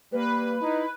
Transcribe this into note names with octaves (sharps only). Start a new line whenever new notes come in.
G3 A#3 B4
D#4 E4